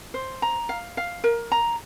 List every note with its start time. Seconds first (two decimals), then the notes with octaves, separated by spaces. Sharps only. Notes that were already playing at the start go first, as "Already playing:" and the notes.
0.14 C5
0.42 A#5
0.69 F5
0.97 F5
1.24 A#4
1.52 A#5